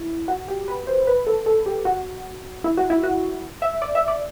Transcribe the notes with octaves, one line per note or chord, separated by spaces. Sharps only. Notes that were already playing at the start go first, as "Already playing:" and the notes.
Already playing: E4
F#4
G4
B4
C5
B4
A4
A4
G4
F#4
E4
F#4
E4
F#4
E5
D5
E5
D5